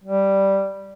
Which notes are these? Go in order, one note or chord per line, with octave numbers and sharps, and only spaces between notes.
G3